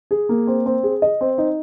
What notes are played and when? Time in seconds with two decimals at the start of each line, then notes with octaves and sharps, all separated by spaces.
0.11 G#4
0.29 A#3
0.47 C4
0.66 C4
0.83 G#4
1.02 D#5
1.21 C4
1.38 D#4